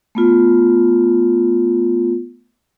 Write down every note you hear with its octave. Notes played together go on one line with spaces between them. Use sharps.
A3 B3 F4